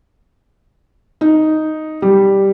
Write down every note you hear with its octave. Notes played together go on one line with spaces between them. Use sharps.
D#4
G3